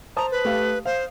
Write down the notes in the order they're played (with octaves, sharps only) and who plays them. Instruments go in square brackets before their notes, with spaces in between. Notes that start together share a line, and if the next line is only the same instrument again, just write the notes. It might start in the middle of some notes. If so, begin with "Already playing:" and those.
[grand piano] C5 A5 D#6 [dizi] A#5
[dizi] B4
[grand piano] A3 G4 F5
[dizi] C5 [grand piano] F5